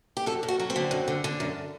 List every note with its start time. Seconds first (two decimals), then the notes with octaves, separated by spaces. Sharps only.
0.17 G4
0.26 F#2 A4
0.43 F#2
0.48 F#4
0.59 F#3
0.70 C4
0.76 D3
0.91 F#2
1.08 D3
1.24 D3
1.40 F#2